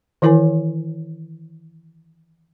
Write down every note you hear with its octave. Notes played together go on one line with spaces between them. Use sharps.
D#3 E3 E4 A#4 C#5 G#5